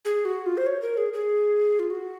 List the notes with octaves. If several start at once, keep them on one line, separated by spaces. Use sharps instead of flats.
G#4
F#4
F4
C5
C#5
A#4
G#4
G#4
F4
F#4